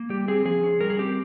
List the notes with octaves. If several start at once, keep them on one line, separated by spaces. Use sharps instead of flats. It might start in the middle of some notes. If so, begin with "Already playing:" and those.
Already playing: A#3
G3 G4
C4 G#4
F3 G#4
C#4
G3 A#4
G#4
C4 G4